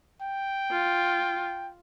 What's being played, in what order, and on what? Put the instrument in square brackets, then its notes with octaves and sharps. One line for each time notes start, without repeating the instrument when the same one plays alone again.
[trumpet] G5
[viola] F4